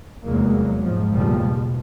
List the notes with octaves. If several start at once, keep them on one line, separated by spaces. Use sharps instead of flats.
F1 E2 F#3 G#3 A#3
G#2 C3 F3
F#1 B1 E2 A#2 F3 G3
B2